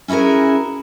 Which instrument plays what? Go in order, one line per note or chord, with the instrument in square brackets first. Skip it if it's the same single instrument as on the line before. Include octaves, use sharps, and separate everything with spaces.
[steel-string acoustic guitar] C#4 E4 F#4 G#4 A#4